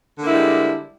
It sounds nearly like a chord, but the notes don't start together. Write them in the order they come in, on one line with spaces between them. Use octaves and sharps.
D3 A#3 E4 G#3 G3